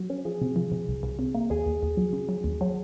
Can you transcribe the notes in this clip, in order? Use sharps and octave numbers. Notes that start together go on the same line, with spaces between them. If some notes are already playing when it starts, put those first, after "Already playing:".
Already playing: F#3 F#4
C#4
F3 G#4
C3
F3
C3
C2
C2
C3
A#3
D#2 G#4
D#2
D#2
F#3
C#3
F#3
D#2
F#3